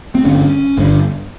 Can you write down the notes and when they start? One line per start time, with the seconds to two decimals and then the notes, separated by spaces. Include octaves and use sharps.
0.15 C4
0.25 G1 G2 D3 C#4
0.77 G1 G2 D3